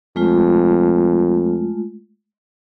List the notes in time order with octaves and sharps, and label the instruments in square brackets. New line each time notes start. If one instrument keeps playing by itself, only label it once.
[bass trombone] F2 [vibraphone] G#3 A3 F4